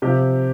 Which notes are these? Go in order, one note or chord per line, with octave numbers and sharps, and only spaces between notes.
C3 F3 G4